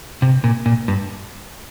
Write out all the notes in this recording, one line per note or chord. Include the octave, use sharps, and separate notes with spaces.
C3
A#2
A#2
G2